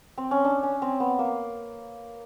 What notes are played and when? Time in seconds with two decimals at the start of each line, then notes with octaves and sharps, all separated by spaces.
0.18 C4
0.31 C#4
0.45 D4
0.63 C#4
0.82 C4
1.00 B3
1.19 A#3